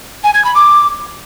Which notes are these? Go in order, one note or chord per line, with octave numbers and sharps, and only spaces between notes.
G#5
G#6
B5
D6